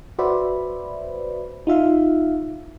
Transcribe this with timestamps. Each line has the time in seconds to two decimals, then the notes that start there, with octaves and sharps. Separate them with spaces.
0.19 F#4 B4 C5 D5 E5 B5
1.67 D#4 F4 E5 F5